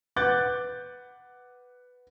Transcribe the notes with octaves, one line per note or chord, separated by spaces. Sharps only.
B4 F#5 D6 F#6 G6 A6